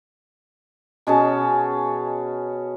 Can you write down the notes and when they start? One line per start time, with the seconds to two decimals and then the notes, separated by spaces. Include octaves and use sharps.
1.07 B2 C#4 G#4 A5